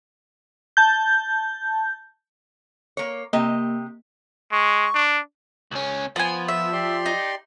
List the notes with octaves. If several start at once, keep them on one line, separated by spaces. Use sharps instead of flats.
A5 G6
A#3 C#5
C3 A#3 G4 D#5
G#3 C#6
D4
C#2 C#4
F3 B3 G#5 A5
E5
G4 D5 C6
D#4